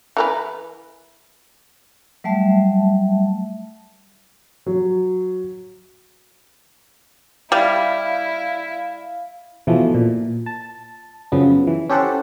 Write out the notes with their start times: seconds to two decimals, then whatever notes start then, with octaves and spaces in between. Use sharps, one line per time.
0.17 E3 A#4 B4
2.24 F#3 G3 A3 E5 A5
4.66 F#3
7.52 G3 E4 F5
9.67 B2 E3 F3 A3
9.94 A#2
10.46 A5
11.32 F#2 C#3 F3 B3
11.67 E3
11.90 C#4 G4 A4 C5 F#5